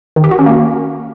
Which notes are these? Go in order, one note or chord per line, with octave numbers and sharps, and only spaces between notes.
D#3
G4
F#4
C#4
A#3